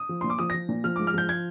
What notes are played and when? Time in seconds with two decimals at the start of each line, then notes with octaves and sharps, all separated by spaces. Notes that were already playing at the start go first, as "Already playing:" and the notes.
Already playing: D#6
0.09 F3
0.21 A#2 C6
0.30 D6
0.39 F3 D#6
0.50 F3 A#6
0.69 A#2
0.84 F3 F6
0.96 G#2 D6
1.07 F6
1.14 F3 G6
1.29 G#6